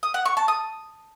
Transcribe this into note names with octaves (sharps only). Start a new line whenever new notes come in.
D#6
F#5
C#6
A5
D#6